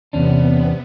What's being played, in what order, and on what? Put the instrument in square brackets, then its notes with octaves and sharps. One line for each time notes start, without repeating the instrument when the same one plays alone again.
[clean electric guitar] E2 C#4 D4 [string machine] C3 B3